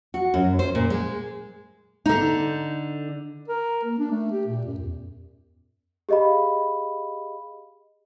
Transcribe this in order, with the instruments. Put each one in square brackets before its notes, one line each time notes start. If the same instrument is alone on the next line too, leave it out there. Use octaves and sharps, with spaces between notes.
[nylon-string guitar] F#4
F#2
C5
A#2
G#3
D3 D#4
[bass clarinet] A#4
A#3
D4
A3
G4
A#2
F#2
E2
[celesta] G4 G#4 D#5 F5 B5